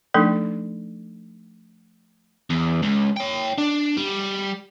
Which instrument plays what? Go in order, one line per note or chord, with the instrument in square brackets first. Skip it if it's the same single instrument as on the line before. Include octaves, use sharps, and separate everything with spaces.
[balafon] F3 A3 D4 D#4 A4
[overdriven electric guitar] E2
C#2
C#5 G5
D4
G3